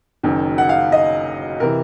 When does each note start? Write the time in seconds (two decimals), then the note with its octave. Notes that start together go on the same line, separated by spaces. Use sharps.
0.23 F#1 F#2 D#3
0.58 F#5
0.69 F5
0.92 D#5
1.60 C3 E3 A#4